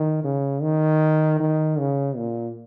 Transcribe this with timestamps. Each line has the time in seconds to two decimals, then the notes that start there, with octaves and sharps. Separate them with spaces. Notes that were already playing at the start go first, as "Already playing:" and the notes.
Already playing: D#3
0.24 C#3
0.62 D#3
1.40 D#3
1.79 C#3
2.17 A#2